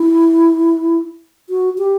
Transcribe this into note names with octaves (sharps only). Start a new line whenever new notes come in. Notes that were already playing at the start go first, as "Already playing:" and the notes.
Already playing: E4
F#4
G4